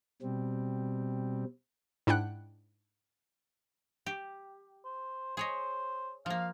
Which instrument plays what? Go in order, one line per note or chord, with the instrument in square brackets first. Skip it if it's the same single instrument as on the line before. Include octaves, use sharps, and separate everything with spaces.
[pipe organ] B2 G3 C4
[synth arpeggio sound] G#2 D4 E4 F#5 G5 F#6
[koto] G4
[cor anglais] C5
[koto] G#4 C#5 D#5 [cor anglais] C5
[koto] F3 A#3 [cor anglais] F5